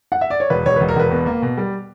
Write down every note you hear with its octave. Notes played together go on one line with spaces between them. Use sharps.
F#5
E5
D5
C#5
E1 B4
E1 C#5
E1 B4
A#4
E1 B4
B2
A#3
B2
G3